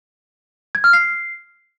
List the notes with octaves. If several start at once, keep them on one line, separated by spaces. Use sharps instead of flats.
G#6
F6
C7